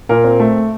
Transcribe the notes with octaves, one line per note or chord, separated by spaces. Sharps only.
A#2 A#4
C4
A3